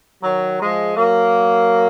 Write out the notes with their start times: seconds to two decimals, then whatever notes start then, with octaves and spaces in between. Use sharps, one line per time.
0.23 D#3 F#3
0.60 F3 G#3
0.97 F#3 A#3